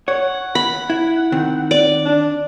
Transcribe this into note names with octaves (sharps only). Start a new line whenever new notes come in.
C#5 F#5
B5
E4
D#3 C4
D5
D4